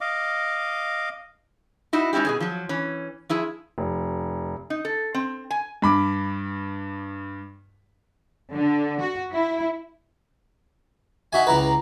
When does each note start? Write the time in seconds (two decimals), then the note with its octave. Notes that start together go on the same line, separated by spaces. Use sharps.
0.01 D#5 F5 D6
1.93 D#4 E4 F#4
2.13 G#3 C#4 D#4 E4 G4
2.25 B2 G#4 G#5
2.40 F3 F#3
2.69 E3 C#4
3.29 F3 E4 G#4
3.78 F1
4.70 D#4
4.85 A4
5.14 C4
5.50 G#5
5.82 G2 B5 D6
8.53 D3
9.01 F#4
9.32 E4
11.33 D#4 F#4 E5 G#5
11.47 C#2 E4 B4 A#5